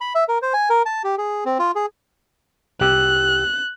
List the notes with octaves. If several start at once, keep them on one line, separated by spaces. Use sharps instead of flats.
B5
E5
A#4
C5
G#5
A#4
A5
G4
G#4
C4
F4
G#4
C2 G4 E6 F#6